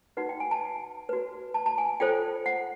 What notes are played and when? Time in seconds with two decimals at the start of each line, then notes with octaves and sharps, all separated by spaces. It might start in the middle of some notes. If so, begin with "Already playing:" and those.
0.17 D#4 F#4 B4 F#5
0.29 G5
0.40 G#5
0.51 A5
0.63 A5
1.09 F#4 B4
1.54 A5
1.66 A5
1.78 G#5
2.00 F4 A4 C5 G5
2.46 F#5